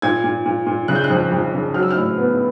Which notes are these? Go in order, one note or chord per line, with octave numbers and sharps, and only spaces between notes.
A#2 G#6
A#2
A#2
A#2
C#3 F#6
G6
F#6
F2
F2
C#3
F#3 F6
E6
A2 F6
B3